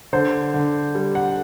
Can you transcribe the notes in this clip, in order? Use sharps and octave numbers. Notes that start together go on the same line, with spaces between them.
D3 C5
D3
G3
F#5